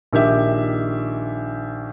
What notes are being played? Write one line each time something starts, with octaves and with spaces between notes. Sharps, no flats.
A#1 D#3 G4 E5